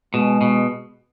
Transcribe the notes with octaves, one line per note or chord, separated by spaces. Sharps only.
B2 G#3
B2